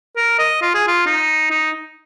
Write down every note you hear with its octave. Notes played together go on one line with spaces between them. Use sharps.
A#4
D#5
F4
G#4
F4
D#4
D#4